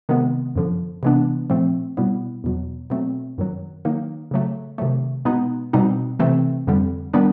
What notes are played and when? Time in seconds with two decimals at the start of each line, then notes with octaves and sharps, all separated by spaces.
0.09 C3 D#3 G#3 B3
0.56 F#2 D3 F3
1.03 C3 E3 G#3 B3 D4
1.50 A#2 F3 A3 C4
1.97 B2 G3 B3 E4
2.44 E2 B2 F#3
2.90 B2 F#3 A3 C4
3.38 F#2 D#3 F#3
3.85 D#3 F#3 A#3 D#4
4.31 C#3 F#3 A3
4.78 C3 D#3 F#3 A3
5.25 B2 G#3 B3 D#4
5.73 B2 G3 C4 D#4
6.19 C3 E3 A3 C4
6.67 F2 D3 G3
7.14 D#3 G3 B3 D4